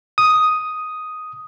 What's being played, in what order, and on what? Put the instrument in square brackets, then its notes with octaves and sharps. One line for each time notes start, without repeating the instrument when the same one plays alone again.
[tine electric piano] D#6